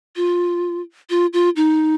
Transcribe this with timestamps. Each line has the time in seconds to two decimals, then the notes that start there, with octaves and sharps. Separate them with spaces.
0.16 F4
1.10 F4
1.33 F4
1.56 D#4